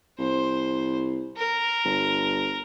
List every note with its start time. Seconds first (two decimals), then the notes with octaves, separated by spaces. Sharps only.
0.19 C2 C5
1.37 A#4
1.85 G1